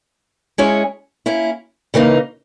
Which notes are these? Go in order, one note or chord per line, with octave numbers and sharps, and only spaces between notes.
G#3 C#4 E4 G#4 C#5
A#3 C#4 E4
C#3 E3 A#3 D#4